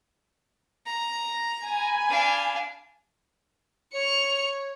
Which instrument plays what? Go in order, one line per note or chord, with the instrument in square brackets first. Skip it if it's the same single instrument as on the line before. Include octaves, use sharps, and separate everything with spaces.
[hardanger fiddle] A#5
[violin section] G#5 B5
[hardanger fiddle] D4 F5
[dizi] C#5 [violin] C#7 F7